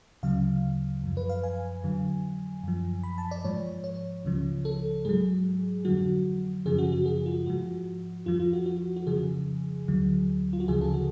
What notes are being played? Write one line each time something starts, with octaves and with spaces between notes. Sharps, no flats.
D2 C#3 F#3 F5
F#2 F3
B4
F5
G#5
F2 D3 F#3
F#2 F3
B5
A5
D5
G#2 F3 C#5
C#5
C#2 C#3 F3
A4
G#2 F#3 G#4
F2 D3 F#3 F#4
F#2 C#3 F3 G#4
F#4
F#4
G#4
F4
G#2 F3 F#4
F2 F3 F4
F4
F#4
F#4
F#4
F2 C#3 F3 G#4
D2 D3 F#3
F4
F#4
D2 C#3 F3 G#4
A4
F#4